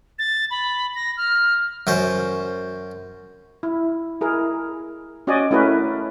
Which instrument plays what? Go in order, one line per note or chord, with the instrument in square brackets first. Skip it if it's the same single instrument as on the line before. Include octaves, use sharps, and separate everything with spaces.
[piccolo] A6
B5
A#6
F6
[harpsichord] F#2 C#4 C5
[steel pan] E4
E4 G#4 A#4
C#4 F#4 D5 D#5 G#5
A3 C#4 E4 F#4 A#4 B4